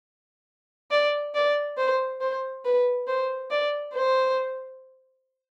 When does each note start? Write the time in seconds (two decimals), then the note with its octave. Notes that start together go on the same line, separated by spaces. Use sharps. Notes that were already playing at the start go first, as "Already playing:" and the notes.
0.91 D5
1.35 D5
1.78 C5
2.21 C5
2.65 B4
3.08 C5
3.51 D5
3.94 C5